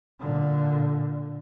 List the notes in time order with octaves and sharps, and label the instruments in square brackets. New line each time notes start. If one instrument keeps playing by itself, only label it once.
[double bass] A#2 D3